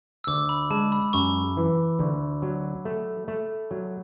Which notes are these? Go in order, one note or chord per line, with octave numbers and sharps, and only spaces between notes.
E6
D2 D6
B5
G#3 A5
B5
F#2 C#6
E3
D2
F#3
A3
A3
F#3